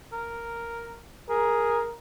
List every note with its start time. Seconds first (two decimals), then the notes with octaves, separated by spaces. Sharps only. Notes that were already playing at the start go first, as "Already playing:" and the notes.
0.12 A#4
1.29 G#4 A#4